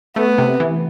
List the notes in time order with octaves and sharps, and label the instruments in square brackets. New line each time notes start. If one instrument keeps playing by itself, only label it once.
[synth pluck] A3 [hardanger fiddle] B3
[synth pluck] C3
E3